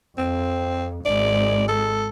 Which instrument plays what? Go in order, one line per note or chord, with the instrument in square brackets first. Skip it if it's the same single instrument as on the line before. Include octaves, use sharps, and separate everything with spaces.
[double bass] F2 [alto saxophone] C4
[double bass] G#1 G#3 [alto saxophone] D5
[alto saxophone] A4